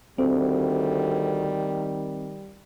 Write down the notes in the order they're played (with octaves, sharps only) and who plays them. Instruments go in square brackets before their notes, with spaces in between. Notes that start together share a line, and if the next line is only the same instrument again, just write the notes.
[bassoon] D2 [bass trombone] D#3 [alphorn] G3 [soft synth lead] C4